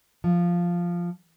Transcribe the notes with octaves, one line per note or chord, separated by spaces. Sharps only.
F3